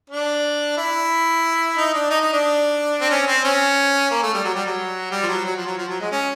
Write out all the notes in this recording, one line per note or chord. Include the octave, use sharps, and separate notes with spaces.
D4
E4
D#4
D4
D#4
D#4
D4
C4
C#4
C4
C#4
A#3
A3
G3
F#3
G3
F#3
G3
F3
F#3
F#3
F3
F#3
F3
F#3
G#3
C#4